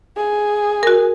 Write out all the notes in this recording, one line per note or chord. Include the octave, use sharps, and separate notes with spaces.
G#4
F#4 A#4